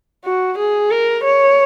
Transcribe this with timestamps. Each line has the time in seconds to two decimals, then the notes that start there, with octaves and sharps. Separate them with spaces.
0.25 F#4
0.58 G#4
0.91 A#4
1.24 C#5